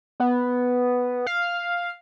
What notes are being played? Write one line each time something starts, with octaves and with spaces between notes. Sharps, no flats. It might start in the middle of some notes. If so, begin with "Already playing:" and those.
B3
F5